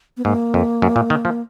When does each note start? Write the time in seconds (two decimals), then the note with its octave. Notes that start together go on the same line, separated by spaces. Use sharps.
0.17 B3
0.25 G#2 A#3
0.54 F2
0.82 F#2
0.96 A#2
1.10 D#3
1.25 F3